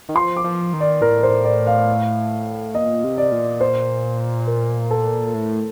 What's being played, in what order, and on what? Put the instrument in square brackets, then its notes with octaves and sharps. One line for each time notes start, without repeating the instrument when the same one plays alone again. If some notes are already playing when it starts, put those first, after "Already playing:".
[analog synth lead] D#3
[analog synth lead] F3 [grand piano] C6
[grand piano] D6
[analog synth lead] F3
D#3
[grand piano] D5
[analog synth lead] A2 [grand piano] A#4
[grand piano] C5
D5
F5
[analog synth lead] A#2 [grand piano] D#5
[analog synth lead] C3
[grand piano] D5
[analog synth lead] A#2
[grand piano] C5
A#4
A4
[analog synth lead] A2